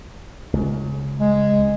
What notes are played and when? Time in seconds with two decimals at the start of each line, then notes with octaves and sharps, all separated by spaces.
0.53 C#2
1.20 G#3